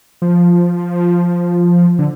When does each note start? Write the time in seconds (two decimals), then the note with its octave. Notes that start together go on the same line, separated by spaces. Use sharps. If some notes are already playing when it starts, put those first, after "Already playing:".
0.22 F3
1.99 D3